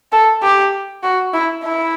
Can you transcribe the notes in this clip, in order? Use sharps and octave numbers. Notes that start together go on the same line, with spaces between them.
A4
G4
F#4
E4
E4